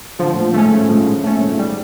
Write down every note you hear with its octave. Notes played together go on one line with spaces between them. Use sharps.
D3 F3
A2
A#2
G#2 A3 C#4
A2
G#2 F3
A2
A#2 A3 C#4
G#2
G3